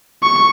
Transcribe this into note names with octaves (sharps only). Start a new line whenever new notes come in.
C#6